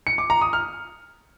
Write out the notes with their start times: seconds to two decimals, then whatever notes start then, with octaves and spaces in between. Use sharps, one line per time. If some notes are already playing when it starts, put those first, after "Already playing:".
0.07 C#7
0.18 D6
0.30 A#5
0.41 D#6
0.53 F6